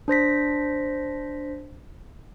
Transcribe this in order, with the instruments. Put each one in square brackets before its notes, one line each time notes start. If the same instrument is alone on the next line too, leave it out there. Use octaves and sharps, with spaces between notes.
[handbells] D4 C5 A#6 B6